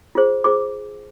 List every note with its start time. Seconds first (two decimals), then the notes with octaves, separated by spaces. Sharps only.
0.15 F4 G#4 C5
0.44 F4 G#4 C5 D6